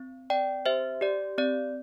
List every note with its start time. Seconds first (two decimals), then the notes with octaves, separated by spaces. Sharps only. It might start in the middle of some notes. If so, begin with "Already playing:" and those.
Already playing: C4
0.30 C4 D5 G5
0.65 G4 C5 E5
1.01 G4 D5
1.38 C4 D5